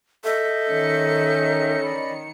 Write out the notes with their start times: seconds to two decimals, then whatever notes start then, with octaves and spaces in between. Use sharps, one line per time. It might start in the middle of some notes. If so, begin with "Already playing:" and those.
0.24 A4 D#5 E5 G6
0.70 D#3 C#4 C#7
1.84 D5 D#5 B5